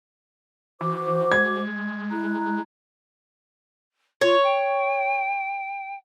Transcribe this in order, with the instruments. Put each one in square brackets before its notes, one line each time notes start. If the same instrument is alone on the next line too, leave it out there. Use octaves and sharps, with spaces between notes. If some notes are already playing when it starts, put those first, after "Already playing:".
[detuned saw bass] E3 [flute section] F#4 C5 D6
[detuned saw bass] G#3 [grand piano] G#6
[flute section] E4 A#5 F#6
[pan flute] F4 [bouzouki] C#5
[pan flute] G5